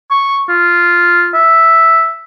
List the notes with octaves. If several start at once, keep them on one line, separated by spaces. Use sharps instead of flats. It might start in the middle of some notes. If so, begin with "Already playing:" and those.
C#6
F4
E5